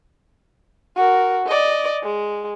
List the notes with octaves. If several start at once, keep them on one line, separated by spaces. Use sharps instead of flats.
F#4 A#4
D5 D#5
G#3